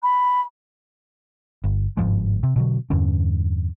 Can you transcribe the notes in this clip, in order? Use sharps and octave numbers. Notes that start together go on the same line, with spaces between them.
B5
G1
G1 G#2 F3 G#3
C3
B2 D3 F#3
E2 G2 D3 C#4